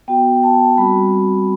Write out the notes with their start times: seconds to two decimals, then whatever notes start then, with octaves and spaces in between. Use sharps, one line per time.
0.08 B3 F#4 G5
0.43 A5
0.77 G3 C4 F#4 B5